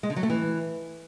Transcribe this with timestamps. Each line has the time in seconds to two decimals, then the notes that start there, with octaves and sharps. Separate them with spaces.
0.03 G#3
0.10 D3
0.16 F#3
0.23 A3
0.30 E3